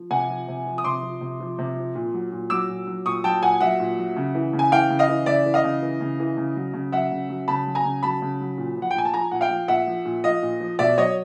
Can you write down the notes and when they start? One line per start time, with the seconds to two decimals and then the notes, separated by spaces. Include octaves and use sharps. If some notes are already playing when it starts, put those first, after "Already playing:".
Already playing: F3
0.11 C3 F#5 G#5
0.30 F3
0.48 C3
0.66 F3
0.78 D#6
0.84 C3 C6 D6
1.03 F3
1.21 C3
1.40 F3
1.59 C3
1.77 F3
1.95 A#2
2.14 F#3
2.32 A#2
2.50 F#3 D6 E6
2.69 A#2
2.87 F#3
3.06 A#2 C#6 D#6
3.24 F#3 G5 A5
3.42 A#2 F#5 G#5
3.60 F#3 E5 F#5
3.80 A#2
3.99 F#3
4.17 C#3
4.35 E3
4.53 C#3
4.59 G#5
4.72 E3 F5 G5
4.90 C#3
4.99 D#5 F5
5.09 E3
5.26 C#3 D5 E5
5.46 E3
5.54 D#5 F5
5.64 C#3
5.82 E3
6.01 C#3
6.20 E3
6.37 C#3
6.56 F#3
6.74 C#3
6.92 F#3 E5 F#5
7.12 C#3
7.29 F#3
7.48 C#3 A5 B5
7.67 F#3
7.75 G#5 A#5
7.85 C#3
8.03 F#3 A5 B5
8.22 C#3
8.41 F#3
8.58 A#2
8.77 F3
8.82 F#5
8.91 G5
8.95 A#2 G#5
9.05 A5
9.14 F3 G#5 A#5
9.32 A#2 F#5
9.41 F5 G5
9.50 F3
9.68 A#2 E5 F#5
9.87 F3
10.05 A#2
10.24 F3 D#5 F5
10.43 A#2
10.60 F3
10.79 B2 D5 E5
10.98 F#3 C#5 D#5